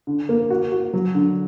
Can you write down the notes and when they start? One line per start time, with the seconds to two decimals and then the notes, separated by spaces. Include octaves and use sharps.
0.07 D3
0.29 A#3
0.50 F#4
0.72 F#4
0.93 F#3
1.15 D3